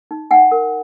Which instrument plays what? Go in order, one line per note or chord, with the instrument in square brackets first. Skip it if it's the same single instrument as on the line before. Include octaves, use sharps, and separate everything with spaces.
[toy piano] D#4
D#4 F#5 G#5
A#4